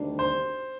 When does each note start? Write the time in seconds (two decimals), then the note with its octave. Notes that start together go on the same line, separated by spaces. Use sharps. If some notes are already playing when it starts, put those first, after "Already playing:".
Already playing: D2 C3 D#3 G3 D4
0.19 C5